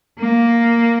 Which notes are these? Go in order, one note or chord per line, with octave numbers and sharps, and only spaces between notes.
A#3